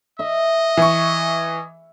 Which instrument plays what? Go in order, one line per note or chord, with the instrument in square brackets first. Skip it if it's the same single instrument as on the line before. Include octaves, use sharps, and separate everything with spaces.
[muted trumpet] D#5 [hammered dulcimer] E5
[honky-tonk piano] E3 C#6